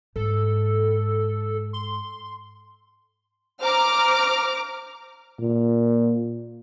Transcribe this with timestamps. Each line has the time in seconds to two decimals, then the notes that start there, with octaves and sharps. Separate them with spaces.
0.16 G#2 A4
1.73 C6
3.61 C5 A#5 D6 F6
5.40 A#2